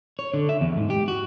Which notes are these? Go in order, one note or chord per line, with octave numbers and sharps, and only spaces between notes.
C#5
D3
E5
E2
G#2
G4
F#4